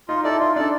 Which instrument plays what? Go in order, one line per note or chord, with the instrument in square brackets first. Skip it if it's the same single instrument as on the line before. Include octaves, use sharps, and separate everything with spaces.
[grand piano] D#4 [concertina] F4
[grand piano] E4 [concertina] A4 D5
[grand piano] D#4 [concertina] F4
[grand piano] D4 [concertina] A4 D5